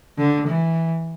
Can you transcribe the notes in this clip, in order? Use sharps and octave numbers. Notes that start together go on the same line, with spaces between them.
D3
E3